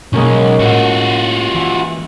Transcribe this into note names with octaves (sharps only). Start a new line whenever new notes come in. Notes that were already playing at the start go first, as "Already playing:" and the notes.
B1 G#3 A#3 C#4
A2 F4 F#4
E3